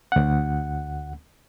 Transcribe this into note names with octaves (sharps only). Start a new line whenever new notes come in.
D2 F#5